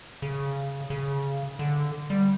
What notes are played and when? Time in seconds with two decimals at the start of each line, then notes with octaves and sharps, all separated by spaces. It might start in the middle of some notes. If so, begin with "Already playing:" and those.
0.22 C#3
0.90 C#3
1.59 D3
2.10 G3